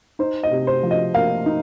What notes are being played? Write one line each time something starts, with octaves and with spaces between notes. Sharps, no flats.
D#4 C5
D#5
C3
C5
F3
D#5
A#3 F5
D#4